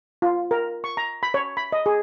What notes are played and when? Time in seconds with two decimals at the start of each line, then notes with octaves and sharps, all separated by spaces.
0.22 F4
0.51 A#4
0.84 C#6
0.97 A#5
1.23 B5
1.34 C#5
1.57 B5
1.72 D#5
1.86 G#4